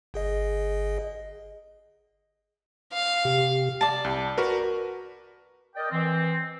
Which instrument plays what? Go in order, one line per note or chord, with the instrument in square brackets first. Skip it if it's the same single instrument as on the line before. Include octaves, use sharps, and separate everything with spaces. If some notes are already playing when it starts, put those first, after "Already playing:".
[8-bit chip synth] G1 G#4 D#5
[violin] F5
[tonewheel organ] C3 G4
[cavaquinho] D5 A5
[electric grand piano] C2
F#4 A#4 B4
[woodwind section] A#4 D5 D#5 G5
E3 C4